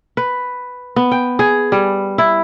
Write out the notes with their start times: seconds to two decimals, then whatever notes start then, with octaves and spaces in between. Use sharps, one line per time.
0.17 B4
0.96 B3
1.12 G5
1.39 G#4
1.72 G3
2.18 E4